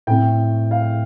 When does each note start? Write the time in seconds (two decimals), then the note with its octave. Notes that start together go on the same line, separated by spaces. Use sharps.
0.07 A2 A3 C4 G5
0.71 F5